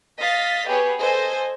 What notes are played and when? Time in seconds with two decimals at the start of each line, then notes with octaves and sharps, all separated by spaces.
0.21 D#5 F5 A6 B6
0.68 B3 G4 G#4 B4 C#5
1.01 A4 C5 D#5 G#5